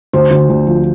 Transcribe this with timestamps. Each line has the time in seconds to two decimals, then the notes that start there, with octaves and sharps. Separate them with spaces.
0.13 D2 C5
0.31 D2
0.50 D2
0.67 F3